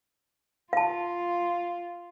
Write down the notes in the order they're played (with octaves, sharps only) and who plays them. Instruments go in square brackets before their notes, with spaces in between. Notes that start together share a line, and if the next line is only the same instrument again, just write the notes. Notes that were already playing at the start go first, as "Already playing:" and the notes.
[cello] F4 [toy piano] F5 A5